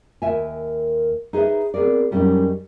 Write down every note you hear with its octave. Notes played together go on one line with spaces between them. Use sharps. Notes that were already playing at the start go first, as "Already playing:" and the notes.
D#2 C#3 A#4 E5 G#5
D#4 G#4 B4 C5 E5
B3 C4 G#4 A#4 D5
F#2 G3 G#3 C4 C#4 D#4